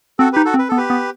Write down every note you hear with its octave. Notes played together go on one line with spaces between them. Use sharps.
C4 F#4 A4
D#4 G4 B4
F#4 A4
C4
B4
B3 A4
G4 B4
B3